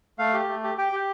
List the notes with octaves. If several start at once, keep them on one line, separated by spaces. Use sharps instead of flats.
A3 F5
G4
A3
G4
G4 G5
G4